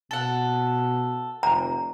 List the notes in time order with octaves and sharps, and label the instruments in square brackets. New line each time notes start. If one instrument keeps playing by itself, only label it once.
[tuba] B2 [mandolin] A4 F#5
[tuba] F1 [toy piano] A#5